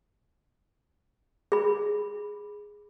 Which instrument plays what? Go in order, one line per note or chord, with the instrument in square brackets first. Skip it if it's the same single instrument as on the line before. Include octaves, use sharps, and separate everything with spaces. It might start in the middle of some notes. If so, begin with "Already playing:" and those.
[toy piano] G#4 B5